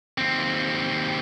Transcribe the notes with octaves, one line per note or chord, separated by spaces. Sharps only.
D#2 C4